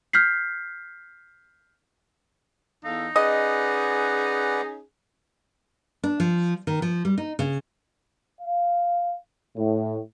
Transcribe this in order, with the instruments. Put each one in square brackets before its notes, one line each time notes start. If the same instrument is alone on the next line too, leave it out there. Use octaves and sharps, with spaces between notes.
[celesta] F6 G6 B6 C7
[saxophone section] E2 A4 F5 [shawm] D#4
[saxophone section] C#4 G#4 [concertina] B4 D5 F#5 [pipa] D#5
[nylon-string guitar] D4
F3
D#3
F3
G3
D#4
C#3
[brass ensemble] F5
A2